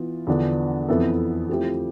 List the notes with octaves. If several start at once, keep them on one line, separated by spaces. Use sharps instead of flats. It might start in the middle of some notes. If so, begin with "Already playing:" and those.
Already playing: E3 B3 F4
E2 D3 F3 B3 D4
F2 E3 B3 E4 A4
F3 A3 C4 E4 G4